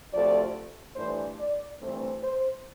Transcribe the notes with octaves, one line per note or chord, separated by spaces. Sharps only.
D2 C3 F3 A3 D5
G2 E3 A3 D4 C5
D5
G2 E3 A3 C4
C5